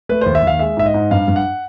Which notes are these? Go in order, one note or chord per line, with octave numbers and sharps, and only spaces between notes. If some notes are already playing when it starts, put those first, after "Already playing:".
A3 B4
D#2 C5
E5
D#2 F5
G#3 E5
G#2 E5
D#5
G#2
G2 F5
G2
F#5